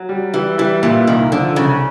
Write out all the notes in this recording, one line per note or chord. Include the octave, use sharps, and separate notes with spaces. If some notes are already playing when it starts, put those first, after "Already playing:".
Already playing: F#3
G3
E3 G3
E3 G3
A#2 E3
C2 D#3
D3 F3
C2 C#3